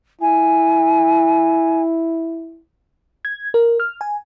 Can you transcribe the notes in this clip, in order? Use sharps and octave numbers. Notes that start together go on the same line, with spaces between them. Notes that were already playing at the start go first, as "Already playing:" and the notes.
E4 G#5
G#6
A#4
F6
G#5